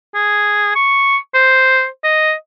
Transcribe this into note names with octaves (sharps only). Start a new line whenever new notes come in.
G#4
C#6
C5
D#5